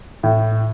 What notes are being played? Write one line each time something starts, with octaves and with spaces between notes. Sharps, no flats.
A2